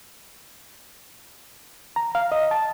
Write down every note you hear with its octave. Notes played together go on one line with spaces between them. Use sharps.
A#5
F5
D#5
A5